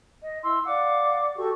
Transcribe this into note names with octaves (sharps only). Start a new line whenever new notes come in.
D#5
E4 C6 E6
D5 F5 F#5 D6
F#4 G4 A4 C#6